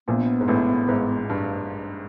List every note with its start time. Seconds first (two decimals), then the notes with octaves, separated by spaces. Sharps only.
0.08 A#1 A#2 B3
0.41 G#2
0.48 A1 A2
0.89 G#1 G#2
1.30 G2